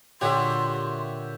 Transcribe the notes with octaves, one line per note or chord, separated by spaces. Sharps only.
A#2 D3 F#4 G4 C#5 E5 C6